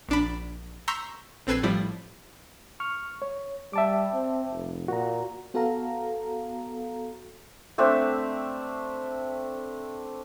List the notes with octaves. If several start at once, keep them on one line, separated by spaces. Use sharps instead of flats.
A#1 D4 B5
A#5 C6 C#6 E6 G6 B6
A#1 C4 A4 B4 G#6 C7
A2 F3 G3 E4
C#6 F6
C#5
G3 E5 A5 D6
C4
F1
A#2 F#4 A#5
B3 F#4 A4 F5 A#5
A3 C4 D4 E5